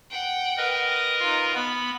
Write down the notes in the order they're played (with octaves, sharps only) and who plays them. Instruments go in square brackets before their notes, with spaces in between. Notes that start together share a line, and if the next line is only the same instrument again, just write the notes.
[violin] F#5 G5
[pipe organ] A#4 B4 D#5
[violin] A#6
D#4 F4
[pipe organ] B3 [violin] B5